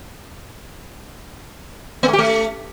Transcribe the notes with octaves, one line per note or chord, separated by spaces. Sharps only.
B3
A3
G4
A3